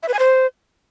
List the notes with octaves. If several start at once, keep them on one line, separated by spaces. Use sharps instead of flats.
E5
B4
G#5
C5